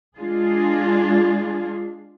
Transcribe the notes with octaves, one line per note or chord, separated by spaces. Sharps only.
G#3 D4 F4 G#4